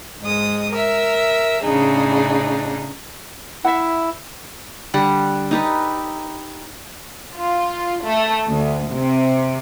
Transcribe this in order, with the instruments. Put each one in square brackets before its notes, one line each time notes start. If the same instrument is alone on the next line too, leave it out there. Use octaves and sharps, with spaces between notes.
[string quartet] G#2 G#3 D#6
A#4 E5
A2 C#3 D4 D#4 G#4
[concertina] E4 [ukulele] E5 F#5
[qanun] D3 G3 F#5
D#4 G4 A4 B4
[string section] F4
A3
D2
C3